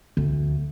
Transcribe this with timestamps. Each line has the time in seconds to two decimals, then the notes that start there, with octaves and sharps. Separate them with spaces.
0.17 D2